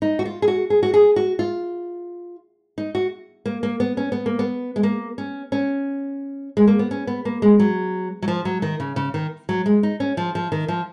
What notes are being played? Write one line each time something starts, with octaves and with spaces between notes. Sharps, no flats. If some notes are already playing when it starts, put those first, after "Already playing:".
D#4
F#4
F4
G#4
F#4
G#4
F#4
G#4
F#4
F4
D#4
F#4
A#3
A#3
B3
C#4
B3
A#3
B3
G#3
A#3
C#4
C#4
G#3
A#3
B3
C#4
B3
A#3
G#3
F#3
F#3
F3
F#3
D#3
C#3
C#3
D#3
F#3
G#3
D#4
C#4
F3
F3
D#3
F3